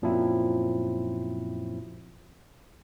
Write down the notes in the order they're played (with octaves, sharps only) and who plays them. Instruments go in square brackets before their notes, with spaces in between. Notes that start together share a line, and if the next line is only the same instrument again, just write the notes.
[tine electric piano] F#2 A#2 F3 F#3 C4 E4